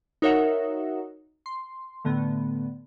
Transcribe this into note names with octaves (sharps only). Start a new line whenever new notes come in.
D#4 F#4 A#4 C#5 E5 F#5
C6
A2 D3 A3 B3